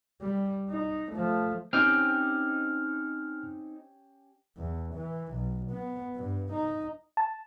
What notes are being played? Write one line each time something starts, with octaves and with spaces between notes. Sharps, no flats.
G3
D#4
F3 A3
C4 C#4 D#4 G4 G5 F6
E2
E3
B1
B3
G2
D#4
A5